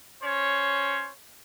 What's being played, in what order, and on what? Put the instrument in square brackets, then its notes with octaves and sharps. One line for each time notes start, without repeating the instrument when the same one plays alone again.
[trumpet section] C#4 C5 C#5